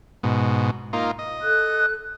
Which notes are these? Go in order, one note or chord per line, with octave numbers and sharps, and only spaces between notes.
G#2 B2
A#3 D#4 F4
D#5
A4 F#6